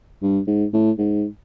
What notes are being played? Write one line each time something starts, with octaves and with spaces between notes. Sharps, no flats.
G2
G#2
A2
G#2